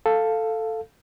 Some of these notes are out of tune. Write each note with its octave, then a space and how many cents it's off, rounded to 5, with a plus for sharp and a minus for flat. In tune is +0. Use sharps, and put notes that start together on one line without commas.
A4 +5 F5 +0